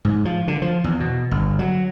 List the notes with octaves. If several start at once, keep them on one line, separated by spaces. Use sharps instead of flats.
G#2
F3
D3
F3
E2
B2
G1
F#3